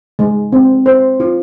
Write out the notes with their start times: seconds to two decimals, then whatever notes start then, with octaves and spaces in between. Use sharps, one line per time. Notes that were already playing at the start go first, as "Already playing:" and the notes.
0.19 G#3
0.52 C4
0.86 C5
1.20 F4